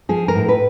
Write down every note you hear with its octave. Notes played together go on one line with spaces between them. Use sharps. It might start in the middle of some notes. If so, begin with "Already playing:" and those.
F3 G#4
A#4
A2
B4